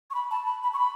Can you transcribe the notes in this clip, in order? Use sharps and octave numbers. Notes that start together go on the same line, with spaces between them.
C#6
B5
A5
B5
B5
C#6
B5